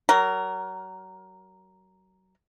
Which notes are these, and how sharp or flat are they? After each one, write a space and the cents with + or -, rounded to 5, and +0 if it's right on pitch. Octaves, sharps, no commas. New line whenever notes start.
F#3 +30 A#4 +0